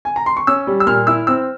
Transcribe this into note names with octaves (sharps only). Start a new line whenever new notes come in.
G#5
A#5
C6
C#6
C#4 E6
G3
E6
A#2 F6
E4 E6
C4 E6